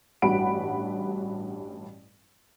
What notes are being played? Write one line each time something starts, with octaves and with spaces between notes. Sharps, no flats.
A1 G2 F#4 F#5 B5 D7